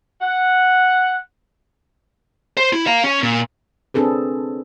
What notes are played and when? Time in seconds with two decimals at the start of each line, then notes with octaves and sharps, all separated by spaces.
0.21 F#5
2.57 C5
2.73 E4
2.87 F5 A#5
3.04 C#4
3.23 A#2
3.94 C4 D4 G#4 A4 B4